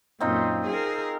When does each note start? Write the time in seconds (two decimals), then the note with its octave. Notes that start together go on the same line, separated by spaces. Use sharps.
0.20 F#2 A#2 C4 D#4 F4
0.66 G#4 A#4